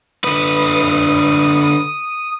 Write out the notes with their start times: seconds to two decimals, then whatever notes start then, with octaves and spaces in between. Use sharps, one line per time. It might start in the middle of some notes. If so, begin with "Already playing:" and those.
0.24 D3 B4 D#6